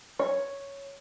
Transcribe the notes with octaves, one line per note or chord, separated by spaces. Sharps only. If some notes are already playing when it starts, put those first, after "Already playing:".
C#5